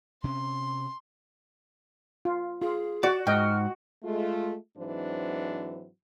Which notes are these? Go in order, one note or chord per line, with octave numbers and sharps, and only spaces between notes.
C3 C#4 C6
F4
F4 G#4
F#4 D5
G#2 D#5 G5 F6
G#3 A3 F4
G#2 E3 F#3 C4 D4 C5